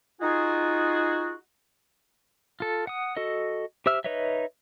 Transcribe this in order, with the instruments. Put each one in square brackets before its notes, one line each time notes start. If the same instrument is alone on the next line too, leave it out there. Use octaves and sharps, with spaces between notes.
[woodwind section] D#4 F4 F#4 G#4
[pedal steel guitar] F4 A4
F#5 D#6
F#4 A4 D#5
G4 C5 E5 E6 F6
D#4 B4 C#5 D#5 E5